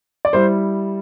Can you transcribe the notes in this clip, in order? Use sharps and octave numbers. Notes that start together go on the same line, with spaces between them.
D5
G3 E4 C5